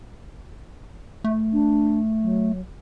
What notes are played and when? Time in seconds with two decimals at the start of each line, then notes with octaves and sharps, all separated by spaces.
1.24 A3
1.53 D4
2.23 F#3